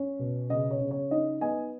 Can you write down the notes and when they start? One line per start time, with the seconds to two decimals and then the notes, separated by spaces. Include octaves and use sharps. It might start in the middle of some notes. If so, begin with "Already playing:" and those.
Already playing: C#4
0.19 B2
0.50 C#3 D#5
0.71 C#5
0.81 C#3
0.91 C#5
1.11 D#4 D#5
1.41 B3 D#5 G#5